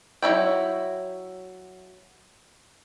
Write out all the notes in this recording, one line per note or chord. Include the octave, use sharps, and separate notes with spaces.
F#3 D#4 E4 G5